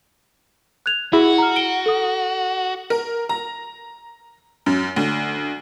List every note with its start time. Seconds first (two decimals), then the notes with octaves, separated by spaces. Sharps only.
0.86 F#6 G#6 F7
1.13 E4 F#4 G#4
1.38 A#5 F6
1.56 D7 G7
1.86 A4 D#6
2.90 A#4
3.29 A#5
4.66 F#2
4.96 D2